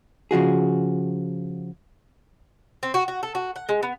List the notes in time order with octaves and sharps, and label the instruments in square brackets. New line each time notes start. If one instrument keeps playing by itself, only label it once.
[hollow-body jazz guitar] C#3 F3 F#4 G#4
[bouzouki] C4
F#4
F#4
A4
F#4
F#5
G#3
B3